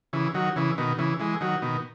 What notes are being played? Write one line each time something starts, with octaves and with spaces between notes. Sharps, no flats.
C#3 E3
D#3 F#3
C#3 E3
B2 D#3
C#3 E3
E3 G#3
D#3 F#3
B2 D#3